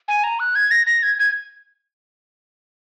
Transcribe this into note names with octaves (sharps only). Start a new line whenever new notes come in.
G#5
A#5
F#6
G#6
A#6
A#6
G#6
G#6